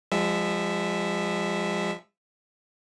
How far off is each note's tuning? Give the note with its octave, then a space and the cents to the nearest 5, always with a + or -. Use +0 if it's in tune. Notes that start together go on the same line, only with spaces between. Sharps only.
F3 +0 G#3 -35 E5 +0